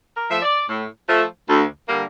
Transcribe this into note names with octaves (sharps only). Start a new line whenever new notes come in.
A#4
F3 A3 E5
D5
A2
F3 A3
D2
D3 G3 A#3